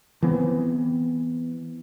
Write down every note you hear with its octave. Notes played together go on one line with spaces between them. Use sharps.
E3 B3 C4